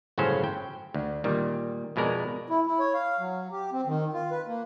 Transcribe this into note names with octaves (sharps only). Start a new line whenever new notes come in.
G1 A2 C#3 F#3 C#4 C5
G5
D2
A#2 D#3 G3
F2 B2 G#3 A#4 D5
E4
E4
C#5
F5
F#3
G4
C4
D#3
F4
B4
A#3